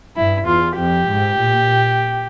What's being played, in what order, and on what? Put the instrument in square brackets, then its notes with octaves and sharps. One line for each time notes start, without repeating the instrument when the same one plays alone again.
[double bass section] G2 [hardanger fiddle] E4
[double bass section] E2 [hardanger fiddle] F4
[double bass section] F2 [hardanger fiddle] G4
[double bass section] G#2
A#2